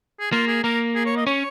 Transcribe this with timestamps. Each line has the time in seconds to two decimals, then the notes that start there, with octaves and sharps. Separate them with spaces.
0.20 G#4
0.32 A#3 F4
0.47 G#4
0.63 A#3 A#4
0.95 G#4
1.06 C#5
1.17 D#5
1.27 C#4 C#5